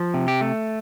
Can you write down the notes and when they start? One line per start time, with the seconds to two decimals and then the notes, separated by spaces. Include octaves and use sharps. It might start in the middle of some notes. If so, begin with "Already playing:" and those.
Already playing: F3
0.14 C3
0.28 G4
0.41 A3